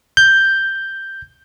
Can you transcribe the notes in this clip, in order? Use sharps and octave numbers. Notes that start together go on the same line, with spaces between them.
G6